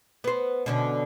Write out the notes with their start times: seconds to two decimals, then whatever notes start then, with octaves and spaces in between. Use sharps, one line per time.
0.24 B3 C5
0.66 B2 D3 C#4